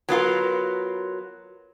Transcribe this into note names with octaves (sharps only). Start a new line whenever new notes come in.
F#3 B3 F4 A#4